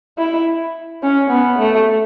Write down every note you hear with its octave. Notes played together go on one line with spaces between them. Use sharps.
E4
C#4
B3
A3